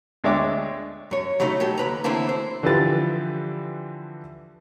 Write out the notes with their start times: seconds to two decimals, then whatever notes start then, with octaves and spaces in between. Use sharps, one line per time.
0.24 D2 G#3 D4 C#5 E5 D6
1.11 F#2 C#5
1.40 C#3 F#3 A3 D#4
1.60 F#3 G4 A4
1.78 D#2 B4 A#5
2.04 D3 E3 A3 A#3 C4 E4
2.29 C5
2.63 D3 E3 F3 G4 B4 A6